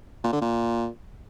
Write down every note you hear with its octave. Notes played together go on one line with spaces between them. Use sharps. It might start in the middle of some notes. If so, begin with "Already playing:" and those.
A#2
D3
A#2